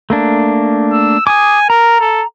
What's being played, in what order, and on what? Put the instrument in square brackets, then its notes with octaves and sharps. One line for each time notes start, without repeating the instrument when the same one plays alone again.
[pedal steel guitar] A3 A#3 D4
[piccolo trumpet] E6
[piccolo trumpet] G#5 [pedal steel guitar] D6 D#6
[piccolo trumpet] A#4 [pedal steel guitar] A#5
[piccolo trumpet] A4